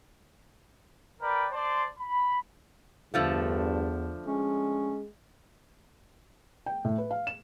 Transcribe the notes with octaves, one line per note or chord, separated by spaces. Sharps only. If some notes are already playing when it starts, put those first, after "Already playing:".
A#4 B4 D5 G5 B5
C5 D5 A5 C6
B5
E2 G2 D3 F3 A3
G#3 C#4
G5
A2
B4
F5
E7